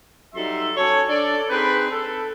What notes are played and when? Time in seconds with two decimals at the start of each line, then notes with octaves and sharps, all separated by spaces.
0.34 F#3 G3 D#4 A4 E5 C6
0.77 F#3 C#4 A4 C#5
1.09 D4 A4 D5
1.49 C4 D#4 G#4 B4
1.91 A4